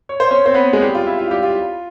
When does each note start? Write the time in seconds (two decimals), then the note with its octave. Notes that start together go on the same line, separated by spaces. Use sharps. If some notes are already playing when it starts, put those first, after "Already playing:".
0.09 C#5
0.20 C5
0.31 C#4 C#5
0.46 C4 C5
0.54 B3 B4
0.73 G#3 G#4
0.82 G3 G4
0.95 F4
1.06 E4
1.19 F4
1.31 G3 G4
1.43 F4